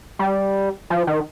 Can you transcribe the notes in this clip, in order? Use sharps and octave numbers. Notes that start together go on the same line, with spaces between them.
G3
F3
D#3